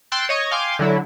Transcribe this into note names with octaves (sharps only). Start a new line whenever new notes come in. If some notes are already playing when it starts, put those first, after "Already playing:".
G5 C6 E6 F#6 A6
C#5 D#5 C#6
F5 G5 G#5 C6 D6
D3 F#3 E4